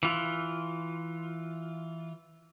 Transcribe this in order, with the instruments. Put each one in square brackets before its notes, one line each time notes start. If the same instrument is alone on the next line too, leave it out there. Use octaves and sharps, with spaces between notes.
[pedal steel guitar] E3 F4